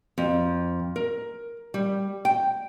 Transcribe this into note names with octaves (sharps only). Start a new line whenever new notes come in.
F2
A#4
G3
G5